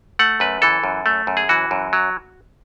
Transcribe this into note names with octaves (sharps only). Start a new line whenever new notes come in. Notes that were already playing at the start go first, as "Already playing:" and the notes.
A3 F#5
F#2 B4
E3 A4
F#2
A3
F#2
G#4
E3 F#4
F#2
F#3